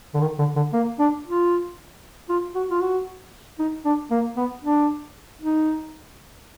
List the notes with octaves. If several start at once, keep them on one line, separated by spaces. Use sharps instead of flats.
D3
D#3
D3
D3
A#3
D4
F4
F4
F#4
F4
F#4
D#4
D4
A#3
B3
D4
D#4